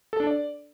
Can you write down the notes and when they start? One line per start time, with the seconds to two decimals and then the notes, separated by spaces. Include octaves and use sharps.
0.13 A4
0.20 D4
0.27 D5